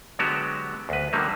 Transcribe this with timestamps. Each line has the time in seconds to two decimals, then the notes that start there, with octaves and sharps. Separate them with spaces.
0.19 D3 F#3 G#3 B3 F#4 G4
0.89 D2 B4
1.13 D3 D#3 F#3 G3 A#3